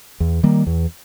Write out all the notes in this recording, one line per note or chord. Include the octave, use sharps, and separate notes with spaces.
E2
D#3 G3 A#3
E2